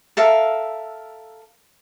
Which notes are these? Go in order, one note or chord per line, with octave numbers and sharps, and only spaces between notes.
A4 A#4 E5 F5